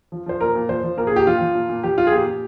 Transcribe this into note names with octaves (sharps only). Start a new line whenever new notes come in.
F3
F3 C5
A#2 A#4
A#2
F3 C5
F3
A#2 A#4
G#4
A#2 G4
F3 F4
F3
A#2
A#2
F3 G4
F3 F4
G#4
A#2 G4
A#2